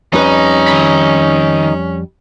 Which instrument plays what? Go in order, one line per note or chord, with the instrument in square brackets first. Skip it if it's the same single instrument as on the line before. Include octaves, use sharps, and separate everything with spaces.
[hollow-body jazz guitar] F2 G3 B4 [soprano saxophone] C#4 [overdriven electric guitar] D#4
[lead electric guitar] D#3 B5